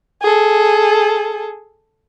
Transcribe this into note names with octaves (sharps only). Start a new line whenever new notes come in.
G#4 A4